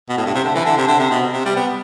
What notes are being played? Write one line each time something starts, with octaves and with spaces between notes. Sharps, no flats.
B2
A2
G2
C3
D3
E3
D3
C3
D3
C3
B2
C3
G3
B3